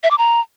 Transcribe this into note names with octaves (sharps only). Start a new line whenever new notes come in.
E5
D6
A#5